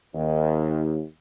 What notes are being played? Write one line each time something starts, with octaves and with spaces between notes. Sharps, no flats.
D#2